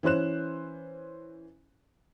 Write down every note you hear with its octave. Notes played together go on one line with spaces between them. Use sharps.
E3 C#4 C5 F#6 E7